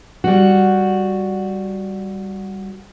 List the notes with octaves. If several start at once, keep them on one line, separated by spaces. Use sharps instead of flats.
G3 F#4